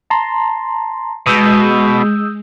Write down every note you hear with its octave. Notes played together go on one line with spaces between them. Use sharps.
A5 A#5 C6
B2 G#3 D#6 E6 G6